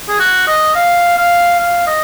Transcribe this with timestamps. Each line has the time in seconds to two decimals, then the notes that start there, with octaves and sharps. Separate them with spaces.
0.09 G#4
0.19 F#4
0.47 D#5
0.75 F5
1.17 F5
1.59 F5
1.87 D#5